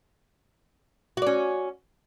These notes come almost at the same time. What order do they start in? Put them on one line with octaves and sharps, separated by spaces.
F#4 D5 C#4